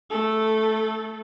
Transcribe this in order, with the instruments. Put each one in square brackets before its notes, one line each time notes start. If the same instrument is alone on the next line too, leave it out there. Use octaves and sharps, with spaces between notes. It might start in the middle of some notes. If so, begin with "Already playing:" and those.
[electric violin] A3 A4